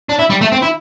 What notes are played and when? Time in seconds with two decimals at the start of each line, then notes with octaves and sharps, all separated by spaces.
0.09 D4
0.19 E4
0.30 G3
0.41 A3
0.52 C4
0.62 E4